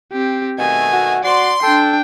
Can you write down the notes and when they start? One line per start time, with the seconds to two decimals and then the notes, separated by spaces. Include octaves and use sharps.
0.13 C4 G4
0.59 B2 D#3 A3 G#5
0.93 F#4
1.24 F#4 D5 C6
1.63 D4 A4 G5